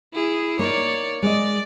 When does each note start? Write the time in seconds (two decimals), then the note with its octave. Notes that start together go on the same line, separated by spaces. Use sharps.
0.13 E4 G#4
0.59 A#3 D#4 C#5 D5
1.22 G#3 D5 D#5